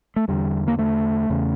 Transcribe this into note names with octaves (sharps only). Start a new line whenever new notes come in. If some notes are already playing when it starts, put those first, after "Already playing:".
A3
E2 D3 G3
A#3
A3
E2 C#3